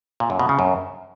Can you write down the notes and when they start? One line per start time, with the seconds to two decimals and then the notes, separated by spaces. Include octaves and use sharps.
0.20 A#2
0.30 F#2
0.39 B2
0.49 C#3
0.59 F#2